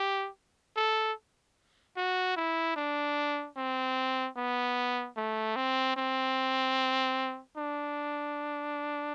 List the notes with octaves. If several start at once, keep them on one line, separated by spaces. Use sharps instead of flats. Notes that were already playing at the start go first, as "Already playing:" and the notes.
Already playing: G4
A4
F#4
E4
D4
C4
B3
A3
C4
C4
D4